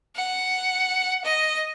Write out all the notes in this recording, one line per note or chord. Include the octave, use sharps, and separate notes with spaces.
F#5
D#5